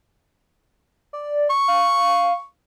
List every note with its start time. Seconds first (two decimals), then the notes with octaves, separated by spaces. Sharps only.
1.13 D5
1.50 C#6
1.68 F5